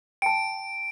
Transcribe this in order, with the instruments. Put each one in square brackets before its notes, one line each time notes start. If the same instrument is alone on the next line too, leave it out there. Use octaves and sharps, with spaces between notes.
[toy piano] G5 A5 [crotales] D7